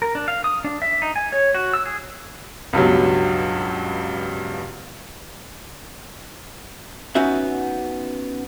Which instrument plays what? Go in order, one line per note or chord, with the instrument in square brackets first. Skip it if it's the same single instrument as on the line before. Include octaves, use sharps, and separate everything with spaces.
[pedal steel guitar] A#4
D4
F5
D#6
D4
E5
D#4
G#5
C#5
F#4
E6
G#4
[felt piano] C#2 G2 B2 F#3
[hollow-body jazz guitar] B3 C#4 D#4 F#4 E5